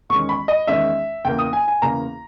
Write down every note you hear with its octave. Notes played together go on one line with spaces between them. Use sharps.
E2 D#3 G#3 C#4 C#6
B5
D#5
E2 D#3 G#3 C#4 E5
E2 C#3 E3 A#3 G5
D#6
G#5
G#5
E2 C#3 E3 A#3 A#5